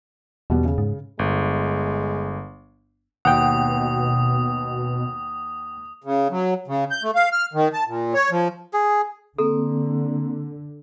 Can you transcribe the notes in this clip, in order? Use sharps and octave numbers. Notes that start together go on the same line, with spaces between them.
E2 B2 G3 B3
C#3
G#2
G1 G#3
D#2 B2 F#5 G5 D#6
C#3
F#3
C#3
G6
A3
F5
F6
D#3
A5
A#2
C#5
F3
G#4
D3 A#3 C4 A4